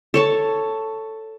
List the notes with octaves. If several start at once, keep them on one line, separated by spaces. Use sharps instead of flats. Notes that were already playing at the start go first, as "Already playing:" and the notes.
A4 C#5 A5